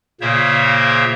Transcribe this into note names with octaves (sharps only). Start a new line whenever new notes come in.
A#2 C#3 A#3 C5 C#5 E5